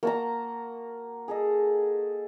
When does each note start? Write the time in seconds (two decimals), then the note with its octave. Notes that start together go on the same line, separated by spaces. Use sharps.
0.03 A#3 F#4 A5 A#5
1.28 G#4 A4 D#5